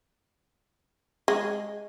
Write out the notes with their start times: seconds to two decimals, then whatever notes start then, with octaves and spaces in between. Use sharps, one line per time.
1.28 G#3